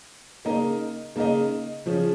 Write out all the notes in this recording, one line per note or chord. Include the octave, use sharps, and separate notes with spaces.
C#3 A#3 D#4 A#4 D#5
C#3 A#3 D#4 A#4 D#5
C#3 F3 C#4